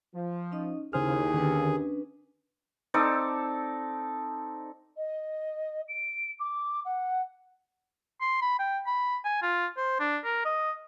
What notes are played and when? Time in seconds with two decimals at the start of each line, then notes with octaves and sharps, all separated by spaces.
0.15 F3
0.52 C#4 D#4 D#5
0.93 D#2 C#3 D#4 E4 G#4 C5 F6
1.34 D3 D#3 C#4 D4 G4 B4
2.94 C4 D#4 A4 D5
4.97 D#5
5.88 D7
6.39 D6
6.85 F#5
8.21 C6
8.42 B5
8.59 G5
8.87 B5
9.25 G#5
9.43 F4
9.77 C5
10.00 D4
10.25 A#4
10.45 D#5